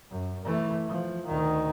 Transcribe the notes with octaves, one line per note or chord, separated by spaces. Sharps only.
F#2
E3 A3
F3
D2 D#3